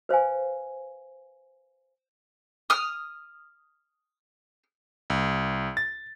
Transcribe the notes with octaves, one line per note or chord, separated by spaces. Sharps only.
B4 C5 F5 G#5
D#6 F6
C2
A6